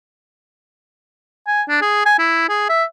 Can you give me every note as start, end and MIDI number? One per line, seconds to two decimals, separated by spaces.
1.47 1.62 80
1.68 1.77 62
1.82 2.01 68
2.06 2.15 80
2.19 2.47 64
2.49 2.66 68
2.69 2.84 76